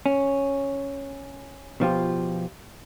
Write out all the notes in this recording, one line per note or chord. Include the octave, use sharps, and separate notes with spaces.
C#4
B2 F3 F4 G4